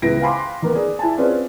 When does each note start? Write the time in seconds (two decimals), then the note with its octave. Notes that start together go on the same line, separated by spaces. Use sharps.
0.02 C#2 B3 E4 A#6 D7
0.21 F5 G5 G#5 B5 C6 D6
0.62 D#3 A#3 B3
0.75 G#4 D5
0.99 E4 G#5 A5
1.17 C4 C#4 F4 G#4 B4 D5